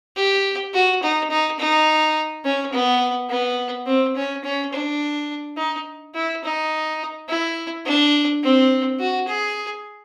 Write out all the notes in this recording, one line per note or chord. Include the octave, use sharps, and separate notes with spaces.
G4
F#4
D#4
D#4
D#4
C#4
B3
B3
C4
C#4
C#4
D4
D#4
E4
D#4
E4
D4
C4
F#4
G#4